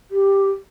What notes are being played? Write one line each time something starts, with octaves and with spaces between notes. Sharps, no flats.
G4